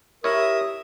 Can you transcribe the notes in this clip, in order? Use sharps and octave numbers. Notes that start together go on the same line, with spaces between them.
E4 G4 A#4 C#5 E5 D#6